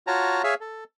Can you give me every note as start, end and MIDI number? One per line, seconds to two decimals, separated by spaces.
0.07 0.42 65
0.07 0.42 66
0.07 0.42 73
0.07 0.42 81
0.07 0.42 82
0.44 0.54 68
0.44 0.54 73
0.44 0.54 76
0.44 0.54 77
0.61 0.84 69